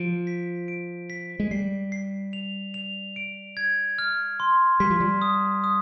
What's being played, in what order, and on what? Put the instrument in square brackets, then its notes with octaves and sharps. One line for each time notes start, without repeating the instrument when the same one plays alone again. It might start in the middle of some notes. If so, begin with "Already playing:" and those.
Already playing: [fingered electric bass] F3 [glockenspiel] D7
[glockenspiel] B6
D7
B6
[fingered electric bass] G#3
[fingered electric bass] G3 [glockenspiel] C7
[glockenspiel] C7
F7
F7
D7
G#6
F6
C6
[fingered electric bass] G3 [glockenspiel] B6
[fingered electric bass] F3
G3
[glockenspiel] D#6
D#6